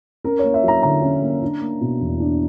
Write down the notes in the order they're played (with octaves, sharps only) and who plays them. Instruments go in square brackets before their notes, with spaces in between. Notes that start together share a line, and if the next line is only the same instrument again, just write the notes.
[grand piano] C#4 A#4
A#3 C#5
E5
F#3 A#5
D3 A#5
C#4
A#3
D4
A#3
B2
E2
D4